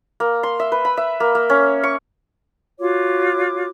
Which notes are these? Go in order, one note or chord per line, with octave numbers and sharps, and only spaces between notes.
A#3
C6
E5
B4
B5
E5
A#3
A#3
C#4
C#6
F4 F#4 C#5 D6